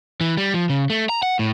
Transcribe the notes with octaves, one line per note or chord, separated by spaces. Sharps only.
E3
G3
F3
C#3
A3
A#5
F#5
A2